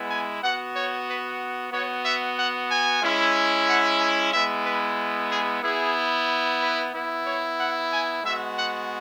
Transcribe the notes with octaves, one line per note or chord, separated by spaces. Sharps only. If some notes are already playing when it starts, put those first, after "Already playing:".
Already playing: G#3 B3 E4
G#5
B3 F#4 F#5
C#5
B4
B3 F#4 C#5
E5
F#5
G#5
G#3 C#4 E4
F#5
G#5
G#3 B3 E4 E5
B4
G#4
B3 E4 G#4
B4
B3 E4
C#5
F#5
G#5
G#3 B3 F#4 E5
F#5